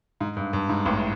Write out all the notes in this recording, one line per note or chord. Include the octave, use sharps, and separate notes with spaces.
G#2
G2
G2
G#2
A1 A2